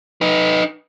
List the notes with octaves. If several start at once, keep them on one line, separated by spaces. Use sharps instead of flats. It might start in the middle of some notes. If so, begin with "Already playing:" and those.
D#4 B4